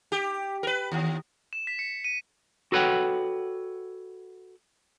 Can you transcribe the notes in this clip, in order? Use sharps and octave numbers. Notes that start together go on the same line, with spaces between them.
G4
A#4 B4
D#2
E7
B6
C#7
D#7
F#4 A4 B4 C#5 F#5 G5